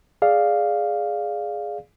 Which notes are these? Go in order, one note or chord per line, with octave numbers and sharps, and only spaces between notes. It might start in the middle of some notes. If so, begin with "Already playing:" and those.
G#4 D5 F5